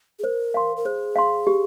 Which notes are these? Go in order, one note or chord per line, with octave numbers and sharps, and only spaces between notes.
G#4
A#4 C5
F5 C6
A#4
G#4 C5
F5 C6
G4